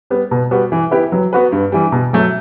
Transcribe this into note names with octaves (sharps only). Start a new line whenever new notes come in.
G3 B3
B2
G3 B3 F#4
E3
B3 E4 G4 B4
F#3
B3 F#4 B4
G2
E3 G3
B2
F#3 A3